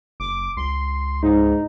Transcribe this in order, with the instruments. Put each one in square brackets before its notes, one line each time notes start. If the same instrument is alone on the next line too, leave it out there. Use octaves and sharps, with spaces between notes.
[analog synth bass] F#1 [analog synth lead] D6
[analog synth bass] C#2 [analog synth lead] C6
[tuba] G#2 [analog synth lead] D#4